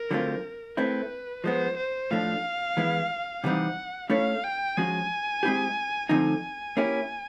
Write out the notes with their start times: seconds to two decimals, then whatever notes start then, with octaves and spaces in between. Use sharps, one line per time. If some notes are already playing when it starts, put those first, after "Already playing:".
Already playing: A#4
0.11 D3 F#3 A3 C4 F4
0.77 A3 C4 E4 B4
1.44 F3 G#3 B3 C5
1.77 C5
2.11 A2 F3 A3 D4 F5
2.77 E3 G#3 B3 E4
3.43 C3 E3 G3 C4 D#4 F#5
4.10 A3 C#4 E4 A4 C#5 F5
4.44 G5
4.77 F3 G#3 C#4 F#4 G#5
5.43 G#3 C4 E4 G4
6.09 D3 F3 A3 C4 D#4 G#5
6.77 A#3 C#4 E4 G4